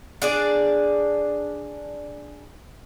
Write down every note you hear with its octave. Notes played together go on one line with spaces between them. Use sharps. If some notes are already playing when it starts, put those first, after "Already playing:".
D4 G#4 D5